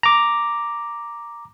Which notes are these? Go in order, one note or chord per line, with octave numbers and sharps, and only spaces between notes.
A#5 D6